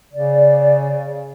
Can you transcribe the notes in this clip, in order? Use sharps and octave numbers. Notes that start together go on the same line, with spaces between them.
C#3 D5